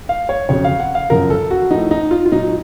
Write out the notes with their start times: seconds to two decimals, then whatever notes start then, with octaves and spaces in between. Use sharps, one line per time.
0.09 F5
0.29 C#5
0.49 F2 C#3 F#3 C#5
0.64 F5
0.80 F#5
0.95 F5
1.10 F#2 C#3 F3 A#4
1.30 A4
1.51 F#4
1.70 A2 F3 D#4
1.91 D#4
2.11 F4
2.26 F4
2.31 A#2 F#3 D#4